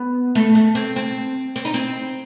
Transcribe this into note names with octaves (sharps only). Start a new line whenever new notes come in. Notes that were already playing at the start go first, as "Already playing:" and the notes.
Already playing: B3
A3
A3
C4
C4
C4
D#4
C4